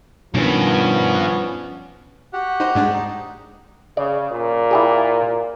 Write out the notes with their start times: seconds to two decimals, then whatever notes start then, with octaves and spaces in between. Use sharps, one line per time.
0.34 G2 B2 D#3 F3 B3 C#4
2.33 F#4 G4 F#5
2.60 D#4 C5
2.75 G#2 G#3 D4
2.93 D#4
3.97 C#3 D5
4.31 A#2
4.71 E4 G4 G#4